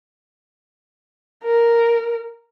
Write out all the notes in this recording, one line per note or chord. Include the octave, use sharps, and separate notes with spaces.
A#4